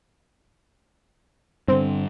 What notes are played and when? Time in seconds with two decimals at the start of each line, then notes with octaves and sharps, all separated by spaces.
1.68 G2 D3 C4